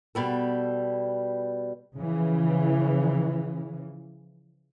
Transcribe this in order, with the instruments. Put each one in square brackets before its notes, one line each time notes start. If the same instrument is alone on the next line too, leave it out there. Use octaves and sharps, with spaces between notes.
[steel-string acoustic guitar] B2 G3 A4
[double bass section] C#3 E3 F3